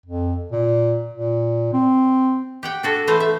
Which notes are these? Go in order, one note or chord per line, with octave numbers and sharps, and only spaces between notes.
F2
A#2
A#2
C4
G4 F#5 G5
D4 F#4 A4
E3 A3 C5 F5
E5